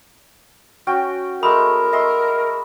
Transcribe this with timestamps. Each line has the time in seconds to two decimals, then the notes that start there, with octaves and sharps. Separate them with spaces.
0.87 C#4 F#4 G5
1.43 G#3 A3 A#4 A#5 B5 D#6
1.93 D#5 E5 C6